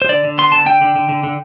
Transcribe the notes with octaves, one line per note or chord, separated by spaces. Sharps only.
C5
D3 D5
D3
B3 C6
D3 A5
D3 G5
D3
D3
D3
D3